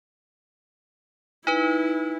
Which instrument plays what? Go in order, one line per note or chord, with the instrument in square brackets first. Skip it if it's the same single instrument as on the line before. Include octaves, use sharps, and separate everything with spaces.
[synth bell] D#4 B4 [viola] E4